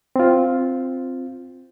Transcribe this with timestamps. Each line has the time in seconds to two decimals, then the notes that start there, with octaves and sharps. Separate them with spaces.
0.16 C4 F4